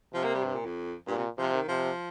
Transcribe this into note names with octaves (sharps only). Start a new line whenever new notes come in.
C3 F3
A#3
G3
G2
A#2
F2
G2 A#2
C3
C3 F3
D#3
C3 F3